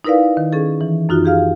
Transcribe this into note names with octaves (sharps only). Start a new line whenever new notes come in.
D#4 E4 A#4 B4 D5 F5
D#3
C#4 G#4 A4
E3
F#2 D#4 F4 F#4
G4 G#4 F5 F6